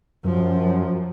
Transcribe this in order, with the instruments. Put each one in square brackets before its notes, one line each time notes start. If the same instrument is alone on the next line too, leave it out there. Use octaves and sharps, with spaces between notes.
[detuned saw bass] F#2 [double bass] F3